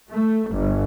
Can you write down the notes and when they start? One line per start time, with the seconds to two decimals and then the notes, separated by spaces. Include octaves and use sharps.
0.11 A3
0.52 G1